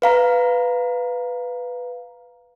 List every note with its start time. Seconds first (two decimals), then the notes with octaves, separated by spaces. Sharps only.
0.02 B4 F5 A#5